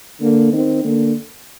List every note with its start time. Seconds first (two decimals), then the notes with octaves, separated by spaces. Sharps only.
0.21 D3 A#3
0.52 D#3 C4
0.84 D3 A#3